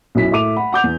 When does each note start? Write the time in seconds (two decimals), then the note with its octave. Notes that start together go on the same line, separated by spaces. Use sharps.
0.15 B1 F#2 E4 B6
0.31 A2 A3 E5 D6 D#7 F7
0.56 F#5 B5
0.72 F#5 D6 G6 F7
0.84 E2